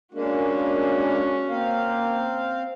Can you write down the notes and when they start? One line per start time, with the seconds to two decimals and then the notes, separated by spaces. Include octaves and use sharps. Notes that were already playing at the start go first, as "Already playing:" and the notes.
0.14 G#3 A#3 C#4 D4 F#4
1.50 A#3 C4 F5